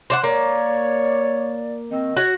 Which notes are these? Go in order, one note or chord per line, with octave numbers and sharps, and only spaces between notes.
C5 D5 F#5 D6
A#3 C#5 D5
D#3 C4 D#5
F#4 C#5